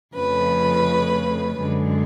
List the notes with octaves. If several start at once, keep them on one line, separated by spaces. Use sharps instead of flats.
F2 C#3 F3 A3 C#4 B4
F#2 D3 G#3